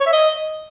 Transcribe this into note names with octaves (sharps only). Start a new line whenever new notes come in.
C#5
E5
D#5